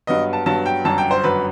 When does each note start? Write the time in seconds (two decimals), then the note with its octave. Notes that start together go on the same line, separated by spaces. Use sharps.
0.07 G2 F#3 B3 D#5
0.33 A5
0.46 G2 F#3 B3 A5
0.66 G5
0.85 G1 F#2 F#3 A5
0.98 G5
1.11 C5
1.24 G1 F#2 F#3 B4